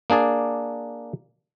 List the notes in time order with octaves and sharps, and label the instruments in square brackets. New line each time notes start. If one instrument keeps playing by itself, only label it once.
[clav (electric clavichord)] A#3 D4 G#4 D5